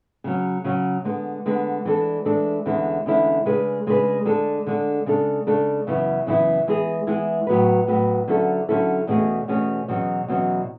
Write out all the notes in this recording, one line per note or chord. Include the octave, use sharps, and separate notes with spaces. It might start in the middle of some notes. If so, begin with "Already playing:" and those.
C#3 F#3 C#4
C#3 F#3 C#4
D3 G#3 B3
D3 G#3 B3
E3 G#3 D4 A4
E3 G#3 D4 A4
E2 D3 G#3 C#4 E4
E2 D3 G#3 C#4 E4
C#3 G#3 D4 G#4 B4
C#3 G#3 D4 G#4 B4
D3 G#3 D4 A4
D3 G#3 D4 A4
C#3 G#3 D4 A4
C#3 G#3 D4 A4
F#2 C#3 E3 B3 E4
F#2 C#3 E3 B3 E4
E3 G#3 B3 E4 G#4
E3 G#3 B3 E4 G#4
A2 F#3 B3 F#4 B4
A2 F#3 B3 F#4 B4
D3 F#3 C#4 E4 A4
D3 F#3 C#4 E4 A4
E2 B2 A3 C#4 G#4
E2 B2 A3 C#4 G#4
E2 B2 F#3 C#4
E2 B2 F#3 C#4